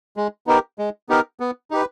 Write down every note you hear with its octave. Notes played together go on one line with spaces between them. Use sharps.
G#3
B3 D#4 G4 A#4
G#3
B3 D#4 G4 A#4
B3
D#4 G4 B4